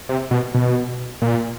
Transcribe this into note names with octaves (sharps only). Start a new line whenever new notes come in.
C3
B2
B2
A#2